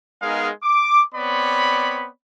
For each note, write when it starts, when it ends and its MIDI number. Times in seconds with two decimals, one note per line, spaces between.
0.21 0.50 56
0.21 0.50 59
0.21 0.50 63
0.21 0.50 68
0.21 0.50 70
0.21 0.50 77
0.63 1.02 86
1.14 2.08 59
1.14 2.08 60
1.14 2.08 73
1.14 2.08 74
1.14 2.08 83